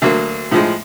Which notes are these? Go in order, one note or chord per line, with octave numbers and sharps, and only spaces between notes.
D2 F#3 A#3
A2 F3 G#3